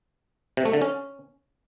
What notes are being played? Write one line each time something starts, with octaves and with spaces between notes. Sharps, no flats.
C3
A3
D3
C#4